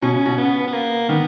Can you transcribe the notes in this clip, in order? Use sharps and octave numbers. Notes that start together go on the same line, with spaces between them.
B2 C#4
C#3
B2
C#3 B3
B3
A#3
D#3 B3